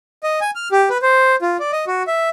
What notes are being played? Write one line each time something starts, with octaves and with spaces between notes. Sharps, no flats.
D#5
G#5
F6
G4
B4
C5
F4
D5
D#5
F#4
E5